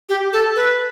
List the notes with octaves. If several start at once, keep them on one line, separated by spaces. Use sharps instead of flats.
G4
A4
B4